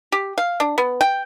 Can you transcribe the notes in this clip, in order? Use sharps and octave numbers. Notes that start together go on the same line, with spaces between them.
G4
F5
D4
B3
G5